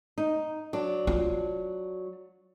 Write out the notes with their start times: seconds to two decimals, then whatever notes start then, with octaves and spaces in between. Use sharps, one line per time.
0.18 D#4
0.73 F#3 D4
1.07 F4